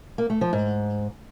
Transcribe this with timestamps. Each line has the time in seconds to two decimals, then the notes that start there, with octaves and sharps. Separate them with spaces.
0.18 A#3
0.30 A3
0.41 F3
0.53 G#2